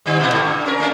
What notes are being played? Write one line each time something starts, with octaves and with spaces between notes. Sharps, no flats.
D3 G3
A#2 B3 E4
G#2 A3
G2
C#4 A#4
A3 C#4 D4